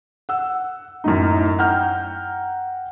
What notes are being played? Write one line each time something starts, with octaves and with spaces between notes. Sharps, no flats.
F#5 E6
F#2 A2 D#4
F#5 G5 A#5 F6 G6